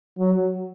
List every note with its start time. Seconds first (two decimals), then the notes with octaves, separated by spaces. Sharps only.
0.18 F#3